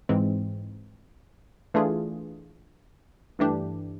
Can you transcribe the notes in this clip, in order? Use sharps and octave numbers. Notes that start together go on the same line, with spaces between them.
G#2 E3 G#3 C4
E3 A3 D4 F4 G#4
G2 E3 A3 D4 G4